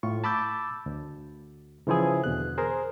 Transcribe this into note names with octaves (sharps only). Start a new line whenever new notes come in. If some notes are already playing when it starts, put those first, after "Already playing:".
A2 F4 C#6
A5 B5 D6 E6 G6 A6
D2
C#3 E3 F3 E4 G#4
E2 B2 D3 F#6
G#4 A#4 C5